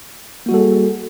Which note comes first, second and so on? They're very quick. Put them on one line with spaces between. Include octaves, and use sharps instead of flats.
A#3 F#4 G3 A4 G#4